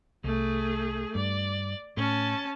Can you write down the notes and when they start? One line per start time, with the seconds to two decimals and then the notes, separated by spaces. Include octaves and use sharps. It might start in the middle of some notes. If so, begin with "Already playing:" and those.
0.24 C2 A3 G#4
1.15 G2 D5
1.97 A2 C#4 A5